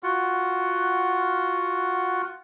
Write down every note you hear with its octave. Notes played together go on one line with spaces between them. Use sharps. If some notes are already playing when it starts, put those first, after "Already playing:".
F4 F#4 F#5